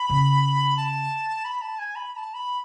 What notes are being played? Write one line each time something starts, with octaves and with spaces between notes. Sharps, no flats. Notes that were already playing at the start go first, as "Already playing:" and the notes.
Already playing: B5
C#3
A5
B5
A5
G#5
B5
B5
A5
B5